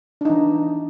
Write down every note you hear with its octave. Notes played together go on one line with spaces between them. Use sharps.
E3 D4 D#4